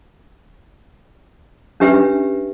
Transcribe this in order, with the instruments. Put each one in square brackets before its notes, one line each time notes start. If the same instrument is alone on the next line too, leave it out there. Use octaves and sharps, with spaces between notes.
[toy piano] C#4 D4 G4 B4 E5 G5